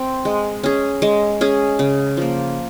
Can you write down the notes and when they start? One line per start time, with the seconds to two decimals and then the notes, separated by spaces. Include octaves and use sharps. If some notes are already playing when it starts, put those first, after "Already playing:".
Already playing: C4
0.25 G#3
0.63 C#4 G#4
1.02 G#3
1.41 C#4 G#4
1.79 C#3
2.17 F3 A#3